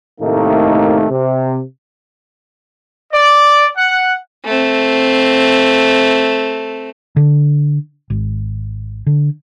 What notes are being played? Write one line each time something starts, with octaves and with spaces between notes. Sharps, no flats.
A2 C3 D#3 A3 A#3 D#4
C3
D5
F#5
A3 C4
D3
G#1
D3